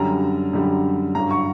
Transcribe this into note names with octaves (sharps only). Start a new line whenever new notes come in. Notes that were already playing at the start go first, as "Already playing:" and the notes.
Already playing: F#2 D3 G3 A#5
F#2 D3 G3
G2 D3 F#3 A#5
C#6